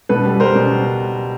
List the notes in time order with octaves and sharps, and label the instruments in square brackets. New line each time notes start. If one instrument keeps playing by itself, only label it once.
[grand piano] B2 A4 B4
G3
G3 A#4 C5
B2